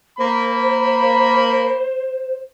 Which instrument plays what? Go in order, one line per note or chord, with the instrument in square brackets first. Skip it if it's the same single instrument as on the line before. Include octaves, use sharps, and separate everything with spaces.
[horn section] A#3 B5 [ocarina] C5